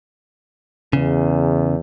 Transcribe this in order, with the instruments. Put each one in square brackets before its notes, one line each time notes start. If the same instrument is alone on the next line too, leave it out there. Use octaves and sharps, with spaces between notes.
[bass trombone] E2 [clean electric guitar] C#3